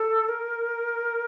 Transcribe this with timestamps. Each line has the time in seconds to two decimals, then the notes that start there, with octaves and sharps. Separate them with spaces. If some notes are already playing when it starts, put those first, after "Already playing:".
Already playing: A4
0.28 A#4